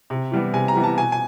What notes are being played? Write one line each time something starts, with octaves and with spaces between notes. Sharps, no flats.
C3
E3 G3 B3
C3 G#5
A#5
E3 G3 B3
A5
B2 G#5
G#5